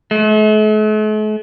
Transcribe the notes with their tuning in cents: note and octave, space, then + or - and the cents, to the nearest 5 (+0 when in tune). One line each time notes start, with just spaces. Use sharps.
A3 -45